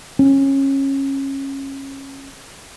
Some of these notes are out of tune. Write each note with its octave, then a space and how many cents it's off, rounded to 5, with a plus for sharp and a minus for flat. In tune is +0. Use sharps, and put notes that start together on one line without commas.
C#4 -20